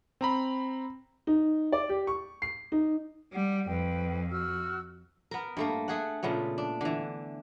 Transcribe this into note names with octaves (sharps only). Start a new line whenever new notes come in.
C4 A#5 B5
D#4
D5
G4
C#6
C7
D#4
G3 F#5
F2 B4 G5
F#4 E6 F6
B3 A#4
G2 A3 A#3
A3 G#4 F#5
A#2 C#3 A3 B3
D4
D3 E3